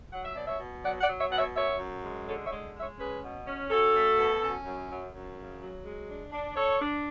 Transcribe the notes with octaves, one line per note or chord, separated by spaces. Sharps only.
F#3 F#5
E5
B2 D5
C#5 E5
B2
F#3 D5 F#5
D5 F#5
F#3
C#5 E5
B2 F#5
C#5 E5
F#2 C#5 E5
F#2
G#3
D3 A4 C#5
C#5 E5
G#3
G#3
C#5 E5
C#4 G#4 B4
B2
C#4
C#4 F#4 A4
A3
B2
C#4
F#2
F#2
F#2
C#3
F#3
G#3
D4
D4
D4 A4 C#5
D4